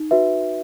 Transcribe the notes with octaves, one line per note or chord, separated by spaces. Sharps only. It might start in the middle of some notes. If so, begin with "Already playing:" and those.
Already playing: D#4
F#4 B4 E5